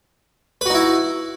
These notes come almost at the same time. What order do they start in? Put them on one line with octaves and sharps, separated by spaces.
B4 F#4 D#4 E4